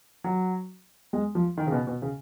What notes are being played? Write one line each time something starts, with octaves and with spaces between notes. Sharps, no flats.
F#3
G#3
F3
D#3
C#3
B2
B2
C#3